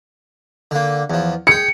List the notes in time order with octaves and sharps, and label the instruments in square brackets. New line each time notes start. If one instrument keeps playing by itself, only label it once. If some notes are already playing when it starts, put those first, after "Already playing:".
[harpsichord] D3 A#3
E2 F3
[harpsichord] G#4 G5 [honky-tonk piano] C#7